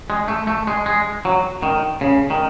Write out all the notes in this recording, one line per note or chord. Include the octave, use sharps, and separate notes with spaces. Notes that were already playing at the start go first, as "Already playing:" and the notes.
G#3
A3
A3
G#3
G#3
F#3
D#3
C#3
D#3